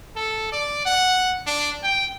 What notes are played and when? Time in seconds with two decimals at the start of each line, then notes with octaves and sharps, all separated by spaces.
0.16 A4
0.52 D5
0.86 F#5
1.47 D4
1.83 G5